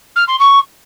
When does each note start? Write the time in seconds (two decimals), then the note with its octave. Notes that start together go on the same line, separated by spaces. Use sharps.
0.16 F6
0.28 C6
0.39 C#6